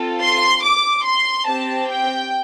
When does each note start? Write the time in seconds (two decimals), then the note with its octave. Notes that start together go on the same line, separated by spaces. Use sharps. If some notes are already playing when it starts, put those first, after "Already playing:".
Already playing: C4 F4 A4
0.22 C6
0.64 D6
1.06 C6
1.48 C4 G4 A5
1.90 G5